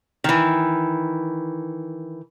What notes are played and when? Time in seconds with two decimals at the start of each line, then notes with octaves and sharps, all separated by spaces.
0.24 D#3 E3